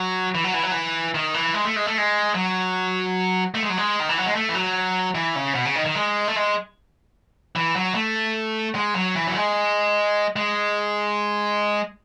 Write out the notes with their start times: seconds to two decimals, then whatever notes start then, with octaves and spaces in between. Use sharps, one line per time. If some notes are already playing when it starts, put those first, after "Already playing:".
Already playing: F#3
0.35 E3
0.44 F#3
0.54 E3
0.63 F#3
0.72 E3
1.14 D#3
1.34 E3
1.54 G#3
1.65 A3
1.76 G#3
1.86 A3
1.98 G#3
2.35 F#3
3.55 A3
3.63 G#3
3.70 F#3
3.78 G#3
4.00 D#3
4.09 E3
4.18 F#3
4.26 G#3
4.35 A3
4.49 E3
4.55 F#3
5.15 E3
5.36 C#3
5.55 B2
5.65 C#3
5.75 D#3
5.86 D#3
5.95 G#3
6.28 A3
6.36 G#3
7.56 E3
7.76 F#3
7.95 A3
8.75 G#3
8.95 F#3
9.16 E3
9.27 F#3
9.36 G#3
10.36 G#3